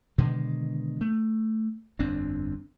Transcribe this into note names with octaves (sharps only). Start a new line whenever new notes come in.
B2 D3 D#3 G#3
A3
G1 F2 C4 D4